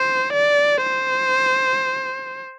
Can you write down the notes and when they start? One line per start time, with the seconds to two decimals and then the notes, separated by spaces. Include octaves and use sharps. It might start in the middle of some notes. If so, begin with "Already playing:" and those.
Already playing: C5
0.33 D5
0.83 C5